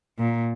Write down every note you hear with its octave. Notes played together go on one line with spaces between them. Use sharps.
A#2